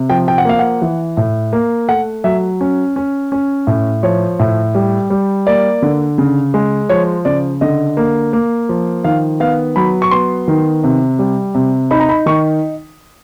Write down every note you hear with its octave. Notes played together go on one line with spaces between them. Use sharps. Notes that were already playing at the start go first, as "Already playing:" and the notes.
Already playing: C3
F3 G5
G5
F#5
A#3 F5
F#5
E3
A2
A#3
A3 F#5
F#3 E5
C#4
C#4
C#4
A2
F3 C#5
A2
G3
G3
A#3 D5
D3
C#3
G#3
F3 C#5
C#3 D5
D3 D#5
A#3
A#3
F3
D#3 F5
B3 F5
F#3 B5
C#6
B3 C6
D#3
C3
G3
C3
D#4 B5
A#5
B5
D#3 C#6